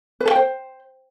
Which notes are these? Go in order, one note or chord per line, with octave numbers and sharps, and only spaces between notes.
B4
A4
G5
C5